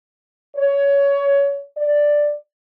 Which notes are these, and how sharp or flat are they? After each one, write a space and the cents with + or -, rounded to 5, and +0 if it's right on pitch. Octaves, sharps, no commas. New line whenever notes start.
C#5 +20
D5 +5